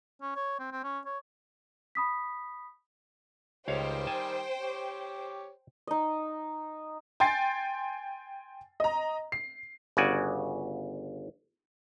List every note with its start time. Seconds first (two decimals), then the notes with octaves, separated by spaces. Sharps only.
0.22 C#4
0.36 C#5
0.59 C4
0.72 C4
0.84 C#4
1.06 C#5
1.95 B5 D#6 B6
3.68 C#2 D#3 G3 G4 C5 C#5 F5 G5
4.07 G#5 A5
4.60 G4 C#5
5.87 D#4 D#5
7.20 G5 G#5 C6 A6 C7
8.80 D#5 A#5
9.32 C7
9.97 G1 C#3 F#4 D5 G#5